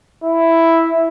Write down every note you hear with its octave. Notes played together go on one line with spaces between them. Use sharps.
E4